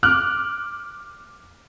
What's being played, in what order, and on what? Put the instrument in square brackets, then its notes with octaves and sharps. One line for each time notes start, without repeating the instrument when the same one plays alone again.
[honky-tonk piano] D6 F6 F#6